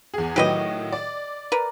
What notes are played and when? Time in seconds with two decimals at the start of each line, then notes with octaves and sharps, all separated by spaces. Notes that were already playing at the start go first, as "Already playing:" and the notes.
0.14 E2 G#4
0.36 A2 D#3 F#3 G4 B4 D#5
0.92 D5
1.52 A#4 B4